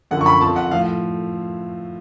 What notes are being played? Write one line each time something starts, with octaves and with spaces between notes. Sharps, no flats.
F#2 D3 F3 F#5
C#6
B5
F2 F3 A5
F#5
A2 F3 F5